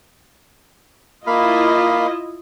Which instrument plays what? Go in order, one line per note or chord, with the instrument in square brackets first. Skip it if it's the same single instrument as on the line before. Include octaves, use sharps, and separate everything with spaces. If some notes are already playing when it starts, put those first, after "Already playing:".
[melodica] A#3 F5 B5 [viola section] E4 F4 D#5